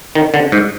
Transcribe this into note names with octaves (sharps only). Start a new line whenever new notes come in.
D#3
D3
G#2